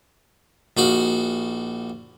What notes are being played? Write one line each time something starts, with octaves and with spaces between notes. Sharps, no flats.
A#1 D#4 F#4 F5